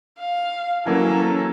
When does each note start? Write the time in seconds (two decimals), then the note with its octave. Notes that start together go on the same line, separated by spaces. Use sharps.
0.18 F5
0.86 E3 F#3 A#3 C#4 A4